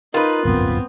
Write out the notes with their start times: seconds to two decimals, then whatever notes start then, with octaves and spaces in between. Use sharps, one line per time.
0.14 D#4 F4 A#4 B4
0.45 D1 G1 F#2 B3 C4